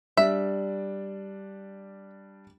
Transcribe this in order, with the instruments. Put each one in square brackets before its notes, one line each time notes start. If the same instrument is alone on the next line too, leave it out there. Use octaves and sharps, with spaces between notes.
[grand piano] G3 D4 [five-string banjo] E5